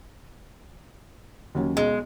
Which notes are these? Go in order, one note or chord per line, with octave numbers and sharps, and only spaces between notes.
D#2 F#3 C#4
B1 G#3